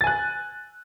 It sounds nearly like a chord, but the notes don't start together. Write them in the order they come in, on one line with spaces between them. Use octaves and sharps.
A6 G#5 F#6